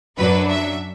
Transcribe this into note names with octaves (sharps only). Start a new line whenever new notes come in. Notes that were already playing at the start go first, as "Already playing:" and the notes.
F#2 F#3 D4 B4
E5